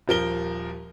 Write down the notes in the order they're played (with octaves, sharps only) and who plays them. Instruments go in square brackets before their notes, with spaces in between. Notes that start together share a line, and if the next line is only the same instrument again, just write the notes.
[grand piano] D#1 F3 A#4 G7